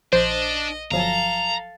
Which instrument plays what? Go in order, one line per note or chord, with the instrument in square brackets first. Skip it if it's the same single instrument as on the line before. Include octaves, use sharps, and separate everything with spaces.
[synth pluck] A#1 [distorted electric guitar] D4 [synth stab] C5 [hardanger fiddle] D#5
[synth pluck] G1 F3 F#3 [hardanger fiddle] A4 F5 [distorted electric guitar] A#5